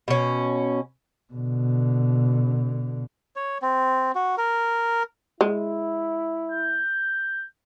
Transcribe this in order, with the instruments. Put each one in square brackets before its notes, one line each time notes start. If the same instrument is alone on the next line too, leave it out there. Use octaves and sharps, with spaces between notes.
[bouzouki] B2 C#4
[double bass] B2 D3
[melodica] C#5
C4
F#4
A#4
[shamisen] G#3 [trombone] E4
[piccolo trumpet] G6